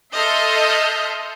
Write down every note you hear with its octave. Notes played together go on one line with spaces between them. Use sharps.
A4 D#5 E5 C6 F6 G6